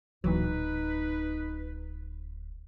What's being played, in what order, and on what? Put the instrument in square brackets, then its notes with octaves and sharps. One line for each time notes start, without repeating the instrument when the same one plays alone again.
[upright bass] D1 [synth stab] A#2 E3 F#3 [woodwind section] D#4 B4